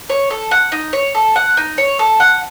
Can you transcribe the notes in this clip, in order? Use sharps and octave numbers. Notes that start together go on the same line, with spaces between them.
C#5
A4
F#5
D#4
C#5
A4
F#5
D#4
C#5
A4
F#5